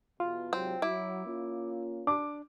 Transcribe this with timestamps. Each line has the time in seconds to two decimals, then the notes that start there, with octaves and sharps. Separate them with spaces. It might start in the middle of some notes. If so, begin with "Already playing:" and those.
0.20 E2 B2 F4
0.53 G#2 C3 F#3 C4
0.82 F#3 E4 D6
1.26 A#3 C#4 F4
2.07 D4 D6